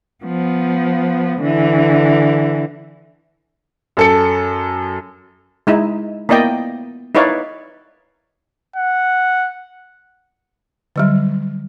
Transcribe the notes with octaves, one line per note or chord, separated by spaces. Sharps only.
F3 B3
D3 E3
F#2 A4 C#7
G#3 D#4 E4
A#3 B3 E4 D5 D#5 G5
D#4 E4 B4 C#5 D5 F5
F#5
D3 F#3 G3